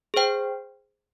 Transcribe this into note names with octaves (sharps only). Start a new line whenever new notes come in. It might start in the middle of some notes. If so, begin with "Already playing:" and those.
G#4 C5 G5